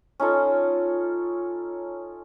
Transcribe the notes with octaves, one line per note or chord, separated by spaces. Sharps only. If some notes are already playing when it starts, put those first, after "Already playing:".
C#4 D#4 F4 A4